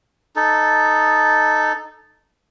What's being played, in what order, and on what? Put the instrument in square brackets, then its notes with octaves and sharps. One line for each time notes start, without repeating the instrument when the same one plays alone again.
[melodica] D#4 A4